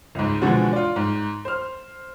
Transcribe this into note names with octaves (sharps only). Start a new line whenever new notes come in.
C#2 G#2
B2 D3 E3 F3 G#3 F#4
F4 D5
G#2
C5 F6